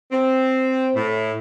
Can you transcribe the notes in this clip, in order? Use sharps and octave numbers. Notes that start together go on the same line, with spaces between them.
C4
A2